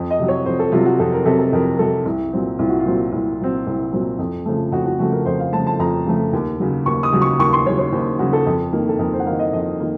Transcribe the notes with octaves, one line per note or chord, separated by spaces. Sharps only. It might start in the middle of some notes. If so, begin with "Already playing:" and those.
Already playing: F2
D#5
C3 F#3
C#5
F2 C5
A4
C3 F#3 F4
F#4
F2 A4
A#4
C3 F#3 A4
A4
F2 A#4
C3 F#3 A4
C2
A#2 F#3 C4
C2 F4
F#4
F4
A#2 F#3 C4
C2
A#2 F#3 C4
C2
A#2 F#3 C4
F2
C#3 F3 A3
F2 F#4
F#4
C#3 F3 A3 F#4
A#4
F2 C5
F5
C#3 F3 A3 A5
A5
F2 A#5
C#3 F3 A3
D#2
C#3 F#3
D#2 C#6
D#6
C#3 F#3
C#6
D#2 C#6
C6
C#3 F#3 C#5
C#5
D#2 C5
C#3 F#3 F#4
A4
F2
D#3 A#3
A4
F2 A#4
C5
F#5
A#3 F5
D#3
D#5
F2 D#5
D#3 A#3